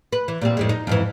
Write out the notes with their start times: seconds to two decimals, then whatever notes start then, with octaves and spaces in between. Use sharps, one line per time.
0.12 B4
0.28 E3
0.41 A#2 G3 C4
0.57 F2 A2 G#3
0.69 D#4
0.87 F2 G#2 E3